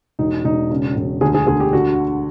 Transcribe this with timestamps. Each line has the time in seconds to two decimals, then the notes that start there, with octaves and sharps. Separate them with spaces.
0.19 E1 D#4
0.44 E1 D#4
0.70 C#3
0.96 E1
1.21 D2 G#4
1.34 G#4
1.47 D2 G#4
1.60 G4
1.73 D3 F#4